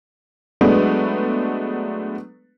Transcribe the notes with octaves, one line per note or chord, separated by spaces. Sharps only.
F#3 G#3 A3 B3 D4 B4